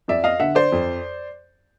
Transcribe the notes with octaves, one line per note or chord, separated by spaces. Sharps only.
F2 D5 E5
D#5 F5
D3 E5 F#5
C5 D5
F2